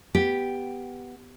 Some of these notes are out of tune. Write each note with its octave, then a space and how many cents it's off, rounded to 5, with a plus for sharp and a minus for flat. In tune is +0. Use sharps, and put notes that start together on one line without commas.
B3 +0 G4 +0